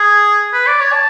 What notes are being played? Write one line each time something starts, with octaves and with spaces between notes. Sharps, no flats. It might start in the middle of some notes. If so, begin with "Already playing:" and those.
Already playing: G#4
B4
D5
C#5
A5